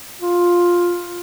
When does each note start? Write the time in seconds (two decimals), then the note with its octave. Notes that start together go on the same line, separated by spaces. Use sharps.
0.21 F4